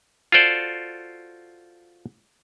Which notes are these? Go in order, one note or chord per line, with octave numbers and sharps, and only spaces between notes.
F4 F#4 A4 C5 D5